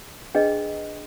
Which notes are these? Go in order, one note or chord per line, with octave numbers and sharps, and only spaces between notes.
D4 G#4 B4 D#5 G5